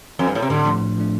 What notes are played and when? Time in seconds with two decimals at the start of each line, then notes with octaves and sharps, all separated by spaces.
0.19 F2
0.27 G2
0.35 A2
0.42 C3
0.50 A2 D3
0.65 F3 A3 D4
0.82 A2
0.97 F3 A3 D4